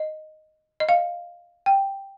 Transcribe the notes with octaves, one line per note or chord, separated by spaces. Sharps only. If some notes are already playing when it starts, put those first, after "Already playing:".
Already playing: D#5
D#5
F5
G5